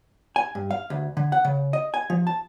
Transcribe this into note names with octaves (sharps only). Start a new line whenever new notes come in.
G#5
G2
F5
D2
D3
F#5
C#3
D#5
G#5
F3
A5